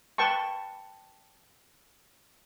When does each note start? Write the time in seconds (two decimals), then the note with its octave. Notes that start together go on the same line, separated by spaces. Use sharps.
0.18 B4 G5 A5 C#6